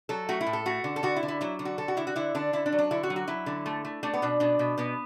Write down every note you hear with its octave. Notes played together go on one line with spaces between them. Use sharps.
F#3 A4
A3 F#4
E4
A2
A4
A3 F#4
D3
A4
D3 F#4
E4
D3
E4
F#3 E4
D3
F#4
D3 A4
F#4
D3 E4
F#4
D3 E4
D3 D4
D3 E4
D4
F#3
D4
D3 E4
F#4
F#3
F#4
F#3 E4
D3
A3
A3
A3 D4
B3
B2 D4
B2 D4
B2
B2 B3